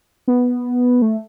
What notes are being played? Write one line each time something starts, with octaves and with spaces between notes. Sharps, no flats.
B3
A3